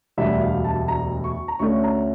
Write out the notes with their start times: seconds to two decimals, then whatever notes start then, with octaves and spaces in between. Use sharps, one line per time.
0.17 E1 D2 D3 G3 E5
0.41 F5
0.64 A5
0.88 A#5
1.24 C#6
1.48 A#5
1.59 D2 D3 A3 C#4 C#6
1.84 A#5